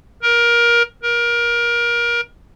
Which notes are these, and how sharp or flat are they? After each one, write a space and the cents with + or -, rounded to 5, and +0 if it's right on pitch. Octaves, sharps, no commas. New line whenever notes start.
A#4 +20
A#4 +25